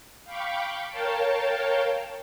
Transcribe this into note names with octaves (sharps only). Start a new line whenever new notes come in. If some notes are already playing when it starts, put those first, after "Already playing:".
F5 G5 B5 C#6 D6
A#4 C#5 F5 G5 A5